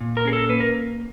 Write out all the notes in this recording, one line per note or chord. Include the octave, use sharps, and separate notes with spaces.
A#2
A#4
C#4 G#4
A4
A#3 B4
A#4